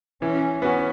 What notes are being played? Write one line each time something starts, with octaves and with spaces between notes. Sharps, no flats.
E3 C#4
B3 C#4 F#4